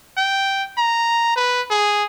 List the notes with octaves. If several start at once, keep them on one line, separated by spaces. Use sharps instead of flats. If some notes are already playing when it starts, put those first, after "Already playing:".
G5
A#5
B4
G#4